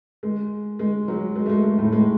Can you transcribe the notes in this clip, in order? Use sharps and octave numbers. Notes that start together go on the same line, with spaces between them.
G#3
G#3
F#3
G#3
A3
G#3
G#3
A2 A3
G#3